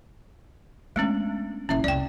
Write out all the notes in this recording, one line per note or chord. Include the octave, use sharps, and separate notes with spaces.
G#3 A3 B3 C#4 D4
D#1 C#4 E4 E5
C2 F2 D5 G5